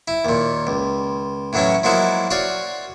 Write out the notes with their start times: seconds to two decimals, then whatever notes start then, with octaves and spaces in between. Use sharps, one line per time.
0.08 E4
0.25 D#2 A#2
0.67 C#2
1.53 A2 E3 F#3 A3 C#4
1.83 F3 F#3 G#3 A#3 E4 F#4
2.31 F#4 C#5 D5 F5